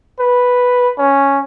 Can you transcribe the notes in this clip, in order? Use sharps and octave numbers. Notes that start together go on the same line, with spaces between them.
B4
C#4